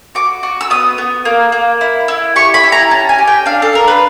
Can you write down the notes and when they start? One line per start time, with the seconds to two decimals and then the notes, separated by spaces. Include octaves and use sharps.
0.15 F#4 D6
0.43 F#4
0.61 E6
0.70 B3 D#6
0.98 B3
1.25 A#3
1.52 A#3
1.81 E4
2.08 E4
2.36 G4 C#6
2.54 B5
2.64 E4
2.72 A#5
2.91 C#4 A5
3.09 G#5
3.18 G4
3.27 G5
3.46 D4 F5
3.62 A4
3.73 D4 A#4
3.88 B4